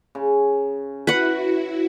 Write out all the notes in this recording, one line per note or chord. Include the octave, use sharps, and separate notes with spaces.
C#3
E4 F#4 B4 F#5